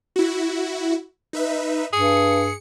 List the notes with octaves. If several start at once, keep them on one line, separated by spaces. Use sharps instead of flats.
E4 F#4
D#4 B4 E5
G2 G#4 C#7